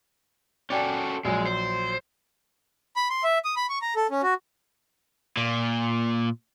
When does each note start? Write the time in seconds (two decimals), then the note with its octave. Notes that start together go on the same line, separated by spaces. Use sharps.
0.70 C#4 F#4 A4 D5 G5 G#5
1.25 A#1 F#3 G#3
1.46 C5
2.96 B5
3.10 C6
3.23 E5
3.45 D#6
3.56 B5
3.69 C#6
3.82 A#5
3.96 A4
4.11 C#4
4.23 F#4
5.37 A#2